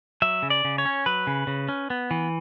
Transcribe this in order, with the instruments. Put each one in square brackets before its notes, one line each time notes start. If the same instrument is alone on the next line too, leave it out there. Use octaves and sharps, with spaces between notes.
[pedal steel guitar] F#3 E5
C#3
D5
C#3
C#5
C#4
F#3 B4
C#3
C#3
C#4
B3
E3